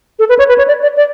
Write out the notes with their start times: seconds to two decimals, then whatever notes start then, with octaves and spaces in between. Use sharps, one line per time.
0.19 A4
0.29 B4
0.39 C#5
0.48 B4
0.58 C#5
0.68 D5
0.82 D5
0.97 D5